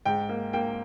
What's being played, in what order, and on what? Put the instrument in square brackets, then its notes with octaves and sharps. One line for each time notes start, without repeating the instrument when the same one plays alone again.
[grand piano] G#2 [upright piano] G5
[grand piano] A#3
[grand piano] A#3 [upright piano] G5